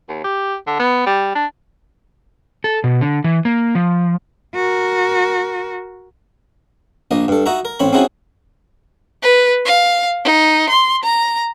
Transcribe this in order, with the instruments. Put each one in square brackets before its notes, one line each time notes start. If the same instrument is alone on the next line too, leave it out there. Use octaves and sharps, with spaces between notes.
[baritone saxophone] D#2
G4
D3
B3
G3
D4
[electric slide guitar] A4
B2
D3
E3
A#3
F3
[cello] F#4 A#4
[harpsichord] A#1 A#3 D#5
G2 A4
D#4 F#4 E5 A#5
A#4
A1 C4 C#5 B5
C4 C#4 D#4 E4 F#4 G#4
[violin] B4
F5
D#4
C6
A#5